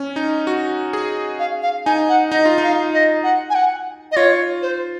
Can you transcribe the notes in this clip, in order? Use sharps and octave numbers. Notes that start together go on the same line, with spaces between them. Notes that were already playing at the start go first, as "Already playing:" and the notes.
Already playing: C#4
D#4
F#4
G#4
F5
F5
D#4 G#5
F#5
D#4 D#5
F4
D#4 F5
D#5
F#5
G#5
F#5
D#5
F4 C#5
C5